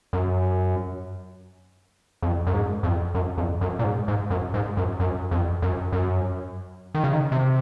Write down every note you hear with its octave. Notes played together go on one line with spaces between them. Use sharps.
F#2
F2
F#2
G#2
F2
F#2
F2
F#2
A#2
G#2
G#2
F#2
G#2
F#2
F#2
F2
F#2
F#2
D#3
C#3
D#3
C3